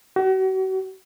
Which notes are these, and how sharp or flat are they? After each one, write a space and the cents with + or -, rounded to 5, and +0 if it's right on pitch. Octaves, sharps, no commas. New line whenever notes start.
F#4 +40